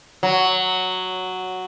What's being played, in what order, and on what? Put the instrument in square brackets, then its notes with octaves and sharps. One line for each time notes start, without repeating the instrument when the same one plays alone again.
[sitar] F#3